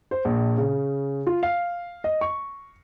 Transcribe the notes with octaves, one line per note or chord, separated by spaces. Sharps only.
C5
A#1
C#3
F4
F5
D#5
C#6